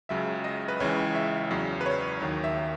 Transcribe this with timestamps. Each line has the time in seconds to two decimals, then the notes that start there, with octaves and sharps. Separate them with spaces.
0.09 C#2 C#3 F#3 E5
0.44 D#5
0.68 B4
0.80 C#2 C#3 E3 C#5
1.15 E5
1.51 E2 C#3 F#3
1.81 B4
1.86 C#5
2.21 D#2 D#3 F#3
2.44 E5